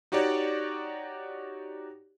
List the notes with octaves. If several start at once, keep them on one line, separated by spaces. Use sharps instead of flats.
D#4 F#4 G4 C#5 D5